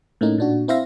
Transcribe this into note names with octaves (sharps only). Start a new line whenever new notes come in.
A2 A3 A#3 C#4 D#4
A#2 D4 F#4
C4 E4 C5 E5 F5 A#6